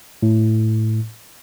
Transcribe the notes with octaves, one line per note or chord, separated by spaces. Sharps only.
A2